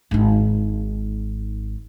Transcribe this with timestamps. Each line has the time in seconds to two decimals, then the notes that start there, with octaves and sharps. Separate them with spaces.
0.11 G#1 D#4